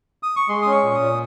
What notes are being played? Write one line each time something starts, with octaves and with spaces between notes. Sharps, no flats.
D#6
C#6
G#3 C6
C#4 D#6
C#6
A#2
D#6
A#2